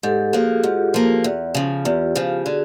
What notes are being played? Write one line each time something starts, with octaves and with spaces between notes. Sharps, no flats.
G#2 G4 A4
F3 A#3 F#4 G#4
G#2 F4 G4
F3 A#3
E2
C#3 F3
E2 F4 G4
C#3 F3
D3 F#4 G#4